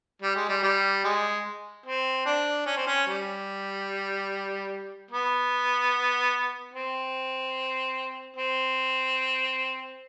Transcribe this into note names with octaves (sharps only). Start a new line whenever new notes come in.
G3
G#3
G3
G3
G#3
C4
D4
C#4
C4
C#4
G3
B3
C4
C4